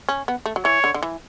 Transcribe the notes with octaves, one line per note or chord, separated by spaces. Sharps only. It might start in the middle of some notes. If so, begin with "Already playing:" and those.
C#4
B3
A3
F#3
E3 C#5
D3
D3
E3